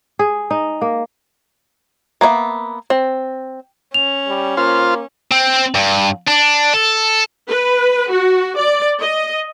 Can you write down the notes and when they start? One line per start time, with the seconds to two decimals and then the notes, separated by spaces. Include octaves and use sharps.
0.19 G#4
0.51 D#4
0.81 A#3
2.21 A#3 B3 C#5 E5
2.90 C4
3.94 C#4 F7
4.28 G3
4.57 A#3 F4 C5
5.31 C4
5.75 G2
6.28 D4
6.74 A4
7.48 B4
8.10 F#4
8.55 D5
9.02 D#5